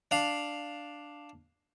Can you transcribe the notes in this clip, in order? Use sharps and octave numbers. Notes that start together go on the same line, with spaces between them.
D4 F5